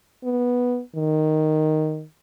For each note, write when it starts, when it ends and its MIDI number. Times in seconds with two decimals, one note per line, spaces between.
0.23 0.80 59
0.96 2.04 51